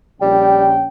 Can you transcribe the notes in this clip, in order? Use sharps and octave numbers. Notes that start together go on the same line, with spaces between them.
A#1 G3 C#4 G5